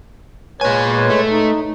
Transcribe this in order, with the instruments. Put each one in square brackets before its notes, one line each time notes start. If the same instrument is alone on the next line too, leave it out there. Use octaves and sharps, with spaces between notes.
[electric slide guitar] A#2 G#5 [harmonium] G#3 B4 C#5
[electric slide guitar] A3
[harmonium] D#4